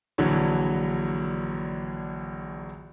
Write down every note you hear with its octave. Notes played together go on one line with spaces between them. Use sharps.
A#1 D3 E3 F#3 C#5